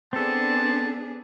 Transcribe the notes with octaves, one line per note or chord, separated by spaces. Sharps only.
B3 C4 D4 G#4 A4 A5